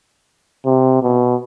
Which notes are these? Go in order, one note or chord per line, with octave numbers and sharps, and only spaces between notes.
C3
B2